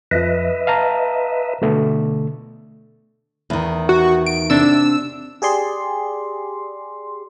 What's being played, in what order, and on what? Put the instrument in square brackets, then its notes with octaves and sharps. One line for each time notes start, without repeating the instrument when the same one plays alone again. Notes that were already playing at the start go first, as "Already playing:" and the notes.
[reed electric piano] F2 F3 [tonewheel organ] B4 D#5 E5
[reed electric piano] F5 A5 A#5
B2 D3 A3
[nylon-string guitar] E2 D#3
[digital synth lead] F#4
D7
[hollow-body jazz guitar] C3 D4 [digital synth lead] E6
[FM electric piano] G4 G#4 D5 C6